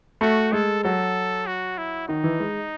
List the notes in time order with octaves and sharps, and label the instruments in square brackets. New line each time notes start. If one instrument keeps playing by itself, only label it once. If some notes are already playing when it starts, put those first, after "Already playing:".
[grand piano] A3 [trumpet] F#4
[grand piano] G#3 [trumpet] A4
[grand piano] F#3 [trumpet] A4
[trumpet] F#4
E4
[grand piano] D#3 [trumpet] D#4
[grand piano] E3
G#3